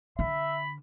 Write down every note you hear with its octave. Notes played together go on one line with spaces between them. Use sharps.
D3 E5 B5